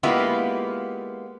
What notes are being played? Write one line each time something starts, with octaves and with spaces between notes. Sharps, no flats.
G#3 A#3 B3 E4 F4 G4